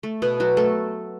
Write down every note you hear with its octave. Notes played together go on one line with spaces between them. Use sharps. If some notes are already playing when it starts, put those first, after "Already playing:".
A3
B2 B3
F#3 F#4
A3 A4